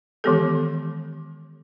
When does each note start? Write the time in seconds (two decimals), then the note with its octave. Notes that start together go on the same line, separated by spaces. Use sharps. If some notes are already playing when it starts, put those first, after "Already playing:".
0.24 D#3 E3 G#3 B3 G4 A4